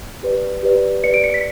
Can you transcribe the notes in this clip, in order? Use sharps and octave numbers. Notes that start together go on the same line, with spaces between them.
G4 B4 D5
G4 B4 D5
G4 B4 D5 C#7
D7
C#7
B6